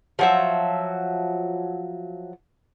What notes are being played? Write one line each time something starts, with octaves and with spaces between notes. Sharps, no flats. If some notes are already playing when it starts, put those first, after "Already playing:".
F3 F#3 E5